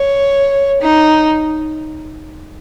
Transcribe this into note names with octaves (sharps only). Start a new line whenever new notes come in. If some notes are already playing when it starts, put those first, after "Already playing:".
Already playing: C#5
D#4